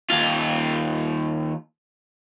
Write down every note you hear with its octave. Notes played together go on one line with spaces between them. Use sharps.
D#2 F4